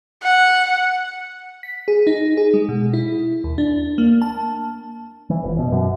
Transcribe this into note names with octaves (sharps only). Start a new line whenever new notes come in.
F#5
B6
G#4
D#4
G#4
G#3
B2
E4
D#2
D4
A#3
A5
E3
F1
B2
F#2